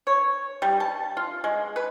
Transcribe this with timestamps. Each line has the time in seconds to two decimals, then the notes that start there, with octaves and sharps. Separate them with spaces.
0.07 C#5
0.62 G3
0.80 A5
1.17 F4
1.44 G#3
1.76 B4